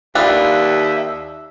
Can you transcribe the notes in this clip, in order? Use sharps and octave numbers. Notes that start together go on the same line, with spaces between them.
D#2 D4 F4 B4 E5